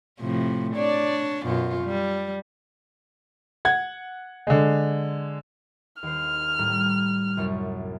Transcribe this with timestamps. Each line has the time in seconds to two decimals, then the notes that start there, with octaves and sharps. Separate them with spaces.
0.20 A2 C3 F3
0.75 D4 C#5 D5
1.45 F#2 B2 F4
1.84 G3
3.65 F#5 G#6
4.47 D3 G#3
6.03 D#2 C5 F6
6.59 A2 G3 A#5
7.37 C2 F#2 C#5